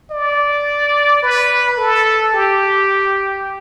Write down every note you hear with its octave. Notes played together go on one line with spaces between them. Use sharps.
D5
B4
A4
G4